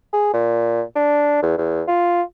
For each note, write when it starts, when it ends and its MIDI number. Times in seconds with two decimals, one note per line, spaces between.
0.13 0.30 68
0.33 0.82 46
0.95 1.39 62
1.43 1.54 40
1.58 1.82 40
1.87 2.22 65